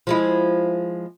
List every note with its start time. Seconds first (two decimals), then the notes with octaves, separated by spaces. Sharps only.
0.07 F3 G#3 E4